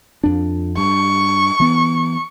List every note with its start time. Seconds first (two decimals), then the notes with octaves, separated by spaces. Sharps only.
0.24 F2 D4
0.77 G2 C#6
1.60 E3 B3